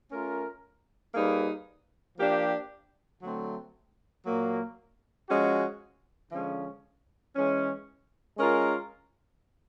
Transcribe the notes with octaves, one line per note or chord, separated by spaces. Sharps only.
A3 C#4 F4 A#4
G3 A#3 D#4 G#4 B4
F3 A#3 D4 G4
D3 F#3 A3 C4
A#2 F#3 A#3
F3 G#3 C#4 F#4
D3 F3 G#3 C#4
E3 G#3 C#4
G#3 C#4 F4 A#4